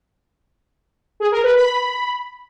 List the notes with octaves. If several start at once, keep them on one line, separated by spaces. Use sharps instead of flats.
G#4
A#4
B4
B5